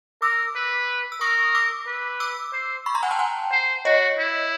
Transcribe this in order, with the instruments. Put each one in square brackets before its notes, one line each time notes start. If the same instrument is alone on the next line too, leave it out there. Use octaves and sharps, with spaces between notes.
[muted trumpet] A#4 [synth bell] D6 E6
[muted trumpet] B4
[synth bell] E6
[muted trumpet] A#4 [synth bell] C#6 D#6
[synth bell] D6 E6
[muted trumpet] B4
[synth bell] D6 E6
[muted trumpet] C5
[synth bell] B5 C#6
A#5 C6
F#5 G#5
G5 A5
F#5 G#5
[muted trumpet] C5
[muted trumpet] F#4 [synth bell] C#5 D#5
[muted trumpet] E4